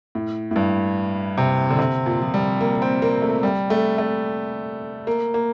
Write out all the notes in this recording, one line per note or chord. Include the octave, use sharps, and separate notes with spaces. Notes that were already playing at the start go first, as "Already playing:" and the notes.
A2
A2
G2
C3
D3
C3
A#2
F3
G3
A#3
A#3
C4
A#3
A3
G3
A3
A3
A#3
A#3